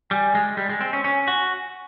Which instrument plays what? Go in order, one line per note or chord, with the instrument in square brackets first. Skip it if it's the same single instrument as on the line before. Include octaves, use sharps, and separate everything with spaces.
[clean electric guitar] G3 [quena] G#5
[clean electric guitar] G#3
G3
G#3
C4
C#4
[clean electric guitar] C#4 [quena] G#5
[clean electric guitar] F#4